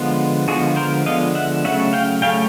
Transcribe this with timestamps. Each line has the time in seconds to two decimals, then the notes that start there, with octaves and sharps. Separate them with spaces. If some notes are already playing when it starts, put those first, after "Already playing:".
Already playing: D3 F3 G#3 B3
0.48 D3 F3 G#3 B3 F#4 G#4
0.76 A#4 C5
1.05 D3 F3 G#3 B3 D#5 F5
1.35 E5 F#5
1.64 C#3 F#3 A3 C#4 E5 F#5
1.93 F5 G5
2.22 C#3 F#3 A3 C#4 F5 G5